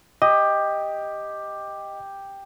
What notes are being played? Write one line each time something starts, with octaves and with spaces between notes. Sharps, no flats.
G4 D#5